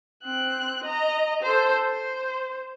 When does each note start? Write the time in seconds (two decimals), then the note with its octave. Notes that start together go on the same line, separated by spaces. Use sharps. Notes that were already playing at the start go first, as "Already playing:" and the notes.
0.23 C4 F#6
0.84 D#5 A#5
1.42 A4 C5
1.85 C5